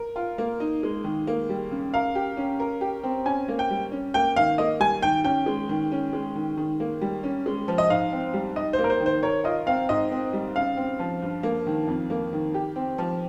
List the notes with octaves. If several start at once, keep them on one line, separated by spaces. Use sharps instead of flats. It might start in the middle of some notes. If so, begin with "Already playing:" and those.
Already playing: A#4
F4
A#3
D#4
G#3
D#3
A#3
G3
C#3
A#4 F5
G4
C#4
A#4
G4
C4
C#4 G#5
A#3
G5
G3
C#4
A#3 G5
D#3 F5
A#3 D#5
G3 G#5
D#3 G5
C#4 G5
G#3
D#3
C#4
G#3
D#3
D#3
A#3
G3
C#4
G#3
F3
D#5
G#2 F5
C4
G3
D#4 D#5
C5
A#3
A#4
C5
D#3
C5
A#4 C#5
F4 D#5
C4 F5
G#2 D#5
C4
G3
C#3 F5
C4
F3
G2
A#3
D#3
F2
A#3
D#3
G4
C4
F3